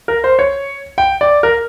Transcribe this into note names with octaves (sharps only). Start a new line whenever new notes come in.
A#4
C5
C#5
G5
D5
A#4